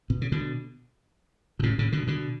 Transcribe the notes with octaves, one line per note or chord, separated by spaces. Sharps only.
B2
C#3
B2 D3
B2
A2 C#3
A2 C#3
B2 D3
B2 D3